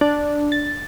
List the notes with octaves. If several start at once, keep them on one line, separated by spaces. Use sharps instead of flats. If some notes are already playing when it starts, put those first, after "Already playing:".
D4
A6